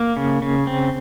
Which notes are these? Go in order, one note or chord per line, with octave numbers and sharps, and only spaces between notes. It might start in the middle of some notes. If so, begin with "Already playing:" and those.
Already playing: A#3
C#3
C#3
C4